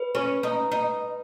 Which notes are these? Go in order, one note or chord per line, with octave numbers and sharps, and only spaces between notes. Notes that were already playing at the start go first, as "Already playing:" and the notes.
Already playing: B4
C#4
D#4
D#4